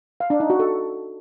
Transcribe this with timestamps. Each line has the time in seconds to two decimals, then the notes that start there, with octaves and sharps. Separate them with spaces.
0.20 F5
0.30 D4
0.40 D#4
0.50 F#4
0.59 A4